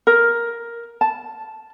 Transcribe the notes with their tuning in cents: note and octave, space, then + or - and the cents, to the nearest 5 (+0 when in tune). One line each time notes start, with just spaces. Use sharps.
A#4 +5
A5 -5